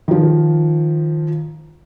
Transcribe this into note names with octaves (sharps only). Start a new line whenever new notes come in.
D#3 F3